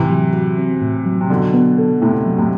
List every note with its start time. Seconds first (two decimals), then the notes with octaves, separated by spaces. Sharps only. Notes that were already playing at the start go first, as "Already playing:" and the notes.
Already playing: A2 C3 E3
0.10 F#3
0.33 F#4
0.58 C4
0.82 A2
1.06 F#3
1.21 C3
1.30 B2 D3 F#3
1.54 B3
1.78 A4
2.01 A2 C3 E4
2.26 F#3
2.38 A2 C3